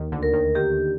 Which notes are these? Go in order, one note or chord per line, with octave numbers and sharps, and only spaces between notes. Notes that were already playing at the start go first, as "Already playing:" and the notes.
Already playing: D#2 D#3
D2 D3
A#4
D#2 D#3
D#2 D#3 G4